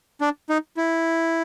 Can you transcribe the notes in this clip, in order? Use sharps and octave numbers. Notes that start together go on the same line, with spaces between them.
D4
D#4
E4